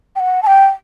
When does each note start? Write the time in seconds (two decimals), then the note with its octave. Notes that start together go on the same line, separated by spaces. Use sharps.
0.16 G5
0.20 F#5
0.43 A5
0.47 G5